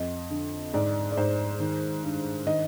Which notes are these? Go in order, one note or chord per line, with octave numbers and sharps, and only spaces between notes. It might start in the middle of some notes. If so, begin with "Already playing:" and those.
Already playing: F2 D#5
D3
G#2 D5
D5
G#2 C5
D#3
G2
D#3 D#5